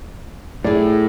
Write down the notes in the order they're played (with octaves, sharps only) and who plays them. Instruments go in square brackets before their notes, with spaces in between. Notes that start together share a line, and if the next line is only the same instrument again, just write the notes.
[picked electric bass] A2 [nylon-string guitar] G#4 D5